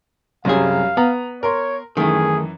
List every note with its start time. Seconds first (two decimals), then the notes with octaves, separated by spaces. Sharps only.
0.45 C2 F#2 F#3 G3 G#4 F5
0.97 B3 A#5
1.43 A#4 C#5 C6
1.97 F#2 D#3 E3 A3 G#4